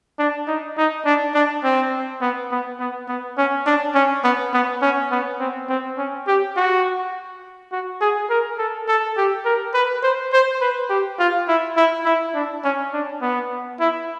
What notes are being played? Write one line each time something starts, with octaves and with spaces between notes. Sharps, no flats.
D4
D#4
D#4
D4
D4
C4
B3
B3
B3
B3
C#4
D4
C#4
B3
B3
C#4
B3
C4
C4
C#4
G4
F#4
F#4
G#4
A#4
A4
A4
G4
A#4
B4
C5
C5
B4
G4
F4
E4
E4
E4
D4
C#4
D4
B3
E4